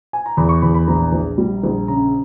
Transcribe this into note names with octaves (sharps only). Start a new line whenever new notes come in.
G#5
A#5
E2 B5
C#6
E2 B5
B5
A#1 A#5
A#1
G3
A#1
C#3 A#5